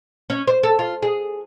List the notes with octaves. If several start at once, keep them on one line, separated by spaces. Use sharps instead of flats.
C#4
C5
A4
F4
G#4